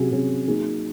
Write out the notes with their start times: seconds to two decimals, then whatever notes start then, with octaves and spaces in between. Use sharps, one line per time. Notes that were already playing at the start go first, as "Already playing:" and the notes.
Already playing: C3 F#3 C#4 G#4
0.11 C3 F#3 C#4 G#4
0.48 F#3 A#3 D#4 G#4